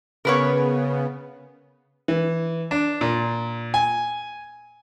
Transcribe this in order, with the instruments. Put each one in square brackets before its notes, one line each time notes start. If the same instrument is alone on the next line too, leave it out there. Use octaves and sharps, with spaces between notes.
[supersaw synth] C#3 B3 [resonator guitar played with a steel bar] A#4 B4 C#5
[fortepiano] E3
D4
A#2
G#5